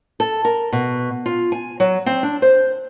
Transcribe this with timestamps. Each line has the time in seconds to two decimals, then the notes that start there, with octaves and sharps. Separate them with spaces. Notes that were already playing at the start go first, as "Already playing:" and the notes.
0.20 A4
0.45 A#4
0.72 B2
1.26 F4
1.52 G#5
1.80 F#3
2.06 C4
2.23 D4
2.42 C5